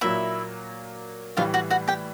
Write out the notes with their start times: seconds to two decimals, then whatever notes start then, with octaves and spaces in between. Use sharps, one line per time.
0.01 A#2 F#3 A#3 E4 E5
1.37 A2 E3 G3 F4 F5
1.54 F#4 F#5
1.70 F#4 F#5
1.88 G4 G5